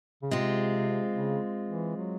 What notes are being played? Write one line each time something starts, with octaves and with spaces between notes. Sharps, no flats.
C#3
C3 G#3 C4 F4
C#3
E3
F#3